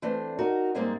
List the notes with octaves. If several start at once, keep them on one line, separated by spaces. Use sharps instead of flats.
E3 A3 C4 D4 C5
D#4 F#4 A#4
G#2 G3 G#3 A#3 C4 D#4